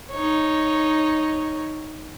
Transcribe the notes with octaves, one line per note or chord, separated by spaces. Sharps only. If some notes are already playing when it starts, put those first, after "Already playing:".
D#4 C#5